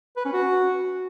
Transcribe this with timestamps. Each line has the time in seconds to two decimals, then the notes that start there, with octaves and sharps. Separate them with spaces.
0.17 B4
0.25 C#4
0.33 F#4